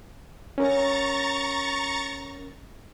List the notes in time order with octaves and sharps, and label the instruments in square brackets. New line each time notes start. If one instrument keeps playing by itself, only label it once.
[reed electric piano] C#4 A#4 [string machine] A#5 C#6 A6